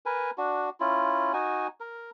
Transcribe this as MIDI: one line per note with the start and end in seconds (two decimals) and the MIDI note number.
0.06 0.31 70
0.06 0.31 71
0.06 0.31 80
0.38 0.69 62
0.38 0.69 66
0.80 1.32 61
0.80 1.32 64
0.80 1.32 65
1.33 1.67 63
1.33 1.67 66
1.33 1.67 80
1.80 2.10 70